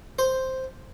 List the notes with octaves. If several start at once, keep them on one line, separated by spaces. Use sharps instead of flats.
C5